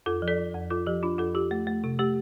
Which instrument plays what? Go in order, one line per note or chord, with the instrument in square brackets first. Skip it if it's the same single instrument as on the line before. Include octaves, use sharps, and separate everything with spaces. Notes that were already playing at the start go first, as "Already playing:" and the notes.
[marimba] F2 F4 A4
F3
A4 D5
F4
F2
F4 A4
F3 G4
D4 F4
F2 F4 A4
F4 G4
A3
A3
C3
A3 G4